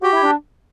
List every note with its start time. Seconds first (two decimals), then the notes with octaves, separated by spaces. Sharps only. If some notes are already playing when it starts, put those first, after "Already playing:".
0.02 F#4 G4
0.13 E4
0.24 D4